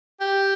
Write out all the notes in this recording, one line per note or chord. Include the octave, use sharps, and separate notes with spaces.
G4